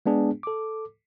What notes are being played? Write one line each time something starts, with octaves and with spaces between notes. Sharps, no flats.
G#3 B3 D4 G#4
A4 D6